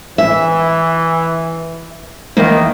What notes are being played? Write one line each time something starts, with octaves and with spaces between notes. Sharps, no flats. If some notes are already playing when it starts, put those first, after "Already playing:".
E3 E5
E2 D#3 A#3